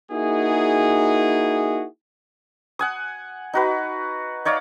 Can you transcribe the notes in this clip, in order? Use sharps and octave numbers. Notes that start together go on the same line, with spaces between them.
A#3 D#4 E4 F#4 G#4
F#5 G#5 D#6
D#4 F#4 B4
D#4 C#5 D5 F5